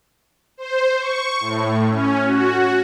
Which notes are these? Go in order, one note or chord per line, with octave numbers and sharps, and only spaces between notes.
C5
C#6
A2
C#4
F#4